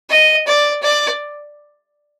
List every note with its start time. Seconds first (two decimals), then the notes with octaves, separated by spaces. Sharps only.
0.10 D#5
0.47 D5
0.82 D5